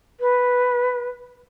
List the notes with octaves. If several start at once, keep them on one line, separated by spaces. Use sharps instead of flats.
B4